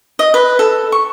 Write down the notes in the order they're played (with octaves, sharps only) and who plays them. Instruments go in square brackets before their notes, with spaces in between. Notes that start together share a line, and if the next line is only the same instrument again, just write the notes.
[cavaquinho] D#5
B4
A4
C#6